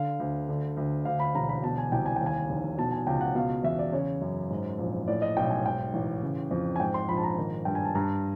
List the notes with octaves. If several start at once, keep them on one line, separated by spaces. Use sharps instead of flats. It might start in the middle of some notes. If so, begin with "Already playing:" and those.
Already playing: D3 F5
D2
D3
D2
D2 F5
B5
E1 A#5
B5
B2 A5
G#5
C2 G5
G#5
G5
D#2
G#5
F1
B2 A5
G#5
C#2 G5
F#5
B2 F5
E2 E5
D5
C#3 C#5
F#2
G#2
A#1
A2 D5
D#5
B1 G5
G#5
G#2 G5
A1
C#3
F2
G#5
G#2 G5
C6
A#1 B5
A5
A#5
D#3
G2 G5
G#5
A5
G2 A#5